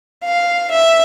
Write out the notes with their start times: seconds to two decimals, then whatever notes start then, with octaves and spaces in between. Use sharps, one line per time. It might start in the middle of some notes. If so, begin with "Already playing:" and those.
0.24 F5
0.71 E5